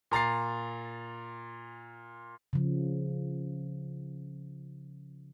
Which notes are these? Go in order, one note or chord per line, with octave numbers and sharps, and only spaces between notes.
A#2 A#5 A6 C7
C#3 F3